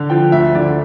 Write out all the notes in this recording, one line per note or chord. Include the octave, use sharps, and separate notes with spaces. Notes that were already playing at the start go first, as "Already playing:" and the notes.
Already playing: D3
F3 G5
D2 E5
D3 D5